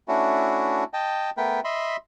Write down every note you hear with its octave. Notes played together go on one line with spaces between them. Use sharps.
A3 C#4 D4 E4 F#4
D#5 G5 A5
A3 B3 A#4 B4 G5
D#5 E5 B5 C6